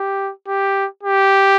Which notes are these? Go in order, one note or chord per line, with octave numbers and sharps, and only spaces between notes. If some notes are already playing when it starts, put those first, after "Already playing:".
Already playing: G4
G4
G4